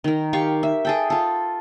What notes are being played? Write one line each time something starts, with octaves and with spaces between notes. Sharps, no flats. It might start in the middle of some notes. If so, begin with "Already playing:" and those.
D#3 A#4
G4 F5 C#6
E5
G#4 A4 G5
F4 A4